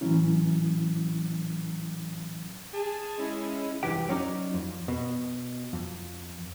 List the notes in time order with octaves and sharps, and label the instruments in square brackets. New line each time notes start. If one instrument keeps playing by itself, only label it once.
[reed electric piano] A2 E3 F#3 C#4 E4
[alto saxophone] G#4 [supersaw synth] A5
[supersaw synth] G#3 C#4 E4
[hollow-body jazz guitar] C2 F2 E3 G4 G5
F#3 C#4 D#4 D5
F2
B2
F2